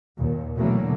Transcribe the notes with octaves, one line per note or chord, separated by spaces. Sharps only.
D#2 A#2
B2 D3 E3 F#3 A3 A#3